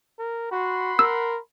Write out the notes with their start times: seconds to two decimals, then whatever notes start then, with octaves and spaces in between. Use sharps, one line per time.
0.19 A#4
0.52 F#4 F#5 B5 C6
0.99 A#4 E6